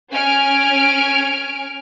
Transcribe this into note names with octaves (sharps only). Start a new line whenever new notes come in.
C#4 G#5 F6 D7